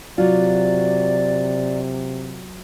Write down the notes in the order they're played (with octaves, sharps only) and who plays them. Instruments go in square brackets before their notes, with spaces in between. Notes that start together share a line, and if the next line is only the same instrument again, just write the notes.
[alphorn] C3 [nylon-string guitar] F#3 F4 [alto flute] D5